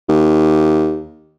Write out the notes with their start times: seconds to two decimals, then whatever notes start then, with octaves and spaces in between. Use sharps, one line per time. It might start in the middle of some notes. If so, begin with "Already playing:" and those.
0.09 D#2